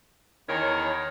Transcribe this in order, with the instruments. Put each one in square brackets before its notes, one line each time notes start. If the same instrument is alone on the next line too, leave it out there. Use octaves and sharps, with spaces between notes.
[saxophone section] E2 D#3 A#4 C#5